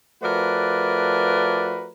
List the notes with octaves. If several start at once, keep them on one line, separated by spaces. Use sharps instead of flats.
F3 A3 F#4 A#4 B4 D5